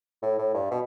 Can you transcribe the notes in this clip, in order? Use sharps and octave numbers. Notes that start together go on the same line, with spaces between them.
A2
A2
G2
B2